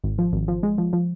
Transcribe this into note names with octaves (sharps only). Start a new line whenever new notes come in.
G#1
F3
G#1
F3
G#3
F3
F3